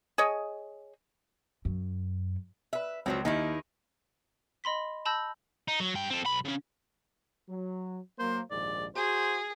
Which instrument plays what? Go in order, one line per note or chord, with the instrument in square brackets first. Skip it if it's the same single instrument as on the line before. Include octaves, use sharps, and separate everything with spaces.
[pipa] G#4 C#5 D#5
[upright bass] F#2
[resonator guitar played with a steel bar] B4 E5
[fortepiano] C#2 [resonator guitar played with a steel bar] F3 F#3 C4
[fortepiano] D#2 [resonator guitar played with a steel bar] D#3 D#4 E4
[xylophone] D#5 B5 C6 B6
A5 B5 E6 G6 A#6
[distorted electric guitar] D#4
F#3
G2 G5
C4 A4
B1 B5
C#3 C#4
[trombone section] F#3
[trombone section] F#3 A#3 [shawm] C5
[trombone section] A#1 D#2 G#2 [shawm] D5
[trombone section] F#4 [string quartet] G#4 [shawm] C5